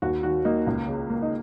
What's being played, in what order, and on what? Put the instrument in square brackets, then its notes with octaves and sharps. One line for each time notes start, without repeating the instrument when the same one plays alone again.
[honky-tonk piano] D#2 F#4
D#3 F#4
A#3 D#4
C#2
C#3
A#3
D#4